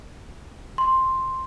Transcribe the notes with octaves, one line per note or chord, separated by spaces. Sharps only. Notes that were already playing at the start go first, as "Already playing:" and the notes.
C6